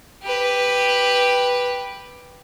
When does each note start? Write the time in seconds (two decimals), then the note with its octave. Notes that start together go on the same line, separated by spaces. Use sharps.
0.23 G4 B4